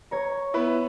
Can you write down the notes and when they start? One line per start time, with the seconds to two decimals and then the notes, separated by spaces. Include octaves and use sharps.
0.11 C#5 A#5
0.54 B3 E4 B4